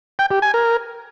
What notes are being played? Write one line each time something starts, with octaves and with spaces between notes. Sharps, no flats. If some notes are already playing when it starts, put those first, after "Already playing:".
G5
G4
G#5
A#4